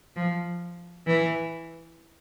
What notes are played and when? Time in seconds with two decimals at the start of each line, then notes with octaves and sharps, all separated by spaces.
0.16 F3
1.06 E3